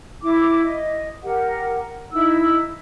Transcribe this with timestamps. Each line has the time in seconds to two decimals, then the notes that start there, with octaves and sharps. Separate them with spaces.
0.22 E4 D6
0.64 D#5
1.23 G4 A#4 F#5
2.12 D#4 E4 E6